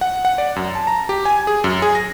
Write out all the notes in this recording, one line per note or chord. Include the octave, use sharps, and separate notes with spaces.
F#5
F#5
D5
F#2
A5
A#5
G4
G#5
G#4
F#2
G#4
A#6